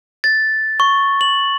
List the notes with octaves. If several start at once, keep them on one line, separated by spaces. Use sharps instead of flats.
A6
C#6
F#7